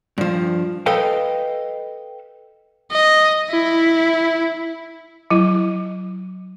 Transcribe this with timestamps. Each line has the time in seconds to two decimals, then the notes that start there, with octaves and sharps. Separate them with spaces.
0.18 G2 F3
0.86 A4 B4 D#5 F5 G5
2.92 D#5
3.51 E4
5.30 F#3 E4